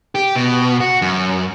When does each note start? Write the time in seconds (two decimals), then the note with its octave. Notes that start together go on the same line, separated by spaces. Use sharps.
0.15 G4
0.36 B2
0.80 F#4
1.02 F#2